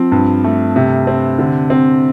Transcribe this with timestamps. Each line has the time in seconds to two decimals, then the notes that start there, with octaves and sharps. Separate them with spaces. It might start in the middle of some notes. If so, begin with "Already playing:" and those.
Already playing: F3 C4
0.12 G2
0.44 A3
0.76 C3
1.07 C4
1.39 D3
1.70 C4